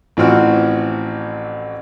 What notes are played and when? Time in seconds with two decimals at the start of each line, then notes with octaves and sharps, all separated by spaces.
0.17 A1 E3 F3 C4 F#4 F6